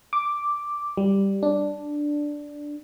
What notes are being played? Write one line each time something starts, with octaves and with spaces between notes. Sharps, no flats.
D6
G3
D4